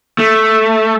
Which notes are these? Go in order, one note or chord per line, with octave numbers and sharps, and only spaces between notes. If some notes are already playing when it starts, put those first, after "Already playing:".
A3